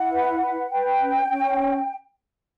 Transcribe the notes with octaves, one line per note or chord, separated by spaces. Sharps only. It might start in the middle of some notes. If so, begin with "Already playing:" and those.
Already playing: E4 F#5
B4
B4
B4 G5
C#4
C#4